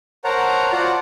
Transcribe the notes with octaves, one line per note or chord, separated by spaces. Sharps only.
A#4 C5 C#5 F#5 A5 A#5
F4 F#4 C5 D5 F#5 A5